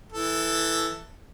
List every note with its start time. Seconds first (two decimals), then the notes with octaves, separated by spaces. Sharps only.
0.12 E3 A4